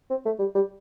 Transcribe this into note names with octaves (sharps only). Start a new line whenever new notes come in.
C4
A3
G3
G3